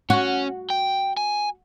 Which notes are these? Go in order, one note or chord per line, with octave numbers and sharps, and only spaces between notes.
C#4 F#4
G5
G#5